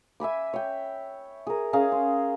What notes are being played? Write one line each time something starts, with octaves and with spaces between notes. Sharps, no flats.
E5 G#5 B5 D6
C#5 G5
G#4 A#4
C#4 G#4 F5 A#5
C6